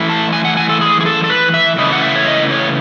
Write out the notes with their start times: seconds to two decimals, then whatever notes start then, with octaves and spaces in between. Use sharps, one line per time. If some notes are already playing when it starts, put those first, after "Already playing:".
Already playing: E3 A3 E4
0.10 A5
0.33 G#5
0.45 F#5
0.57 G#5
0.69 A4
0.81 G#4
1.00 G#4
1.06 A4
1.24 A4
1.30 B4
1.54 E5
1.78 C#3 E3 A3 E4 D#5
1.93 F#5
2.02 E5
2.16 C#5
2.26 D#5
2.51 C#5